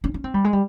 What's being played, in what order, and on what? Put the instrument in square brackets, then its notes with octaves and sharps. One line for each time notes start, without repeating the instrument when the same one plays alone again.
[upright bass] C#4
C#4
C4
G3
G#3
G3